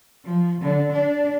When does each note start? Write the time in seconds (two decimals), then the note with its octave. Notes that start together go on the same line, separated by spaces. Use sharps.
0.25 F3
0.62 D3
0.93 D4